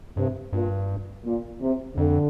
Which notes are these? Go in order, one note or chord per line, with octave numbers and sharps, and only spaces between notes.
G2 C3
G2 A#2
A#2
C3
F2 D3